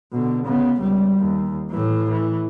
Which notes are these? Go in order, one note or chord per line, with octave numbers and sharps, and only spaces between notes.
B2 D3
C#3 B3
C#2 G3
D#2
A2 E3
E3